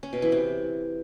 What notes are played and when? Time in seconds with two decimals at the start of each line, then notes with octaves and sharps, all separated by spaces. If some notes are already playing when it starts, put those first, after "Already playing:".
0.03 C#4
0.13 B2
0.22 E3
0.32 C3